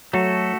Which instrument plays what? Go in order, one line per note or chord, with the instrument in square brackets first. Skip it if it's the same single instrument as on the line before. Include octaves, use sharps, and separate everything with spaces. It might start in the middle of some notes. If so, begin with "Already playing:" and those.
[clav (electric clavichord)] F#3 [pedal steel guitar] A3 F#4 A4